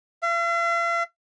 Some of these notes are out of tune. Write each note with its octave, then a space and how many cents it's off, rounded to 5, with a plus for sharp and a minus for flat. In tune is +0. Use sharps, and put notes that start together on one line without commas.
F5 -45